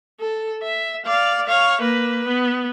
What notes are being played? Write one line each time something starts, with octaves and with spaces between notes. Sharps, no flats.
A4
E5
D5 F5
C#5 F5
A#3 B4
B3